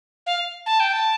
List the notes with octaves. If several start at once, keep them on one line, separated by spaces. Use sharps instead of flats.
F5
A5
G5
A5